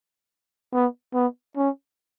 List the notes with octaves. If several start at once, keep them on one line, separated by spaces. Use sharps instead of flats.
B3
B3
C#4